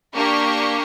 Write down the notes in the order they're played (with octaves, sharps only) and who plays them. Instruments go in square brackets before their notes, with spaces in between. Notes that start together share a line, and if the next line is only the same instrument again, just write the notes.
[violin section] A#3 D4 G4 C#6